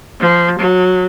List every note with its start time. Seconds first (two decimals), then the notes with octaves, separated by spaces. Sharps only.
0.20 F3
0.58 F#3